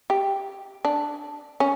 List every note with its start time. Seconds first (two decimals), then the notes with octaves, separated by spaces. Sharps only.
0.10 G4
0.85 D4
1.60 C#4